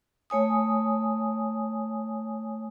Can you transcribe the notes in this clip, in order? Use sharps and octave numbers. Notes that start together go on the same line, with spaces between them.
A3 C#5 G#5 D#6